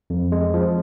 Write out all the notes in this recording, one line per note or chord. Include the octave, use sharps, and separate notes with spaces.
F2
G#3
F3